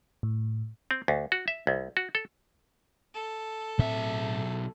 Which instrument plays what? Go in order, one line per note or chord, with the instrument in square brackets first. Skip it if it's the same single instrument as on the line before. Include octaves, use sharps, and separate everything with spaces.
[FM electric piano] A2
[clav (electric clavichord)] C4
D2
F#4
E5
C2
F#4
A4
[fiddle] A4
[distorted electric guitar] B1 E5 [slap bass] A2 C4